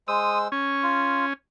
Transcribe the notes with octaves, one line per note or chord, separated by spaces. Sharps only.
G#3 C5 D#6 E6
C#4 C#6
F4